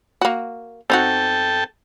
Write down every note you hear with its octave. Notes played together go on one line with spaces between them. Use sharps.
A#3 F#4
C4 D#4 F#4 A4 G5 A5